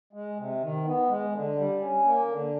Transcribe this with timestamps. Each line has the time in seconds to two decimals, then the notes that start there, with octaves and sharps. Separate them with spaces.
0.13 G#3
0.37 C3
0.61 D#3
0.84 B3
1.08 G#3
1.32 D3
1.56 G3
1.80 C#4
2.04 A#3
2.27 D3